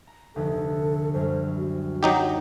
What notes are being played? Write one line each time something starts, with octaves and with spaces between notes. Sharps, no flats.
A#5
F1 D2 A4
F#2 F#3 G3 C5
F#4
F#3 D#4 G4